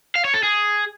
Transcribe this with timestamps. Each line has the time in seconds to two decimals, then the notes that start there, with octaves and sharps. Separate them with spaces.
0.15 F5
0.25 C#5
0.34 A4
0.43 G#4